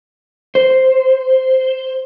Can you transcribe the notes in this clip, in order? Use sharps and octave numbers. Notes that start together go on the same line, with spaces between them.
C5